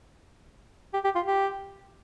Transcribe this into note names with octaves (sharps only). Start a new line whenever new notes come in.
G4
G4
F4
G4